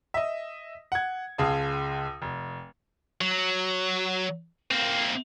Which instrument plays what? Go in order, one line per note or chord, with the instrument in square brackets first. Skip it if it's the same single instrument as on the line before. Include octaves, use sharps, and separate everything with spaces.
[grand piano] D#5 E5
F#5 G#6
C#2 G#4 F5 A5 D#6
F1
[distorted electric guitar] F#3
A#3 C4